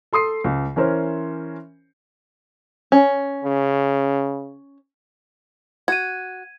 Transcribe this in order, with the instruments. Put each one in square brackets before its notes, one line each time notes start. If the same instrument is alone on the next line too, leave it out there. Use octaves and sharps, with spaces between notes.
[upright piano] A4 C6 D#6 C7
C#2
E3 C#4 A#4 C5 C#5
[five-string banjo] C#4
[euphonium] C#3
[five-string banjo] F#4 [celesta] G#6 D#7